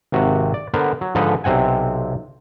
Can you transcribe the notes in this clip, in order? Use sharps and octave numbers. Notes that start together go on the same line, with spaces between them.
G#1 C3 F#4
D5
D3 B3 A#4 C5
F#3
G#2 D3 F3 D#4 A4 B4
B1 C3 C4 F#5 G#5